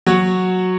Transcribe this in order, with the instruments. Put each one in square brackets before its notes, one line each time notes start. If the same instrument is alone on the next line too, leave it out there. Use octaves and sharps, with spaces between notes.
[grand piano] F#3 F#4